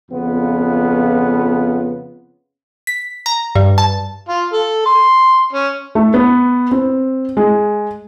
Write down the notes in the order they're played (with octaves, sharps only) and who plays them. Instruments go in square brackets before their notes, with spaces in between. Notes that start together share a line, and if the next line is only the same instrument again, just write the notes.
[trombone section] F2 C#3 B3 F4
[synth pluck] B6
A#5
G2
A5
[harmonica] F4
A4
C6
C#4
[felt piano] A3
B3
C4
G#3